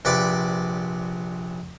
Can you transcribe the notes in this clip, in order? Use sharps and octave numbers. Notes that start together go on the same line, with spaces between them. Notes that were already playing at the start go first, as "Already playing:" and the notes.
A#1 C3 B4 D5 D6